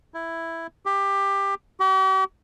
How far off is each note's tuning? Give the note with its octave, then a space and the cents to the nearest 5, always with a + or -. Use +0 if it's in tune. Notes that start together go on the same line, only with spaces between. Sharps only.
E4 +5
G4 +15
G4 -45